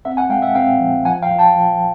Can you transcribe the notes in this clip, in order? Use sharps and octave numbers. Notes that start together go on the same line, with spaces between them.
C4 E5 F#5
F#5 G#5
G#3 F5 G5
E5 F#5
C4 F5 G5
F3
F3 F#5 G#5
F5 G5
F3
G5 A5
F3